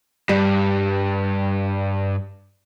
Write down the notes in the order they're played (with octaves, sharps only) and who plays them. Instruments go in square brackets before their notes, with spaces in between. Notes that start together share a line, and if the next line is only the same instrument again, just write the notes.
[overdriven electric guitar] G2 [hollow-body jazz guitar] G3